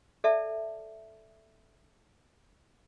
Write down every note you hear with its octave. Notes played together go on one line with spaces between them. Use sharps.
A4 D5 E5 A5